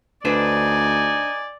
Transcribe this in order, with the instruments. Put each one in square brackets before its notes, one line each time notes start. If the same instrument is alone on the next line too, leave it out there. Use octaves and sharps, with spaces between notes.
[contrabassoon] D2 [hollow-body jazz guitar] D4 B4 C5 [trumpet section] D#4 G#5 [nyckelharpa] D5